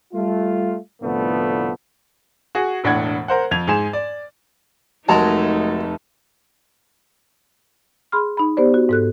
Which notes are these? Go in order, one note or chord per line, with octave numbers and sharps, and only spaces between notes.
G3 A3 F4
C2 A2 D3 F3 A3 B3
F#4 G#4
E1 A2 D4 F#5 G#6
A#4 C5 F#5
F2 G#6 F7
G#2 G#4 G#5 E7
D5
F1 F#3 G#3 A3 D#4 A#4 A5 F7
G#4 B5 C6 F6
D#4 B5
B3 G4 C5 D5
F#4
G#2 A4 F#6